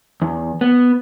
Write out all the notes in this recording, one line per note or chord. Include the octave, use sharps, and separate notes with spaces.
E2
B3